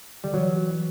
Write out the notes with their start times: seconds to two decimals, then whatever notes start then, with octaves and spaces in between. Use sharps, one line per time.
0.24 D3 G3
0.34 E3 F#3